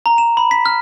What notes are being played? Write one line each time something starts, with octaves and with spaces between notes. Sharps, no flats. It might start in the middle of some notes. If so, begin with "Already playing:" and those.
A#5
E7
B5
B6
F6